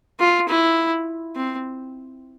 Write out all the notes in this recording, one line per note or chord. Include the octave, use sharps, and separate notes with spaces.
F4
E4
C4